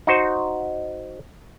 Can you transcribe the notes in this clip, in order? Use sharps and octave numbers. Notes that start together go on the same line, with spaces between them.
D#4 F#4 C5